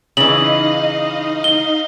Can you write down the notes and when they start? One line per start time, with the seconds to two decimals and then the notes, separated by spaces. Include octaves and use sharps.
0.17 C#3 E3 D#4 D#5 F5 F#7
1.44 G7